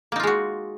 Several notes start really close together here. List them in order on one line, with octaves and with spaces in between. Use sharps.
A#3 D#4 F4 G#3 F#4